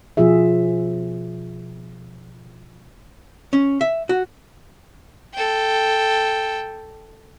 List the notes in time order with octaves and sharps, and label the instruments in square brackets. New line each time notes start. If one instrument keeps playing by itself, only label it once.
[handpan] B2 F3 F4 G#4 E5
[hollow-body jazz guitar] C#4
E5
F#4
[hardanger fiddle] A4 G5